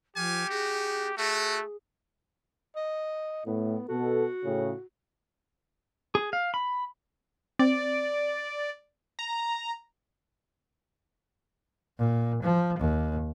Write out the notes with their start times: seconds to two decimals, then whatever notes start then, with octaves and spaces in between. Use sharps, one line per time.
0.16 F3 G4 A4 F5 G#5
0.49 B3 D#4 F#4 G#4
1.18 A3 F#4 G#4
2.76 D#5
3.46 A2 B3
3.89 B2 F#4 A4
4.44 A2 C#3
6.15 G#4
6.33 F5
6.54 B5
7.59 C4 D5
9.19 A#5
11.99 A#2
12.43 F3
12.79 D#2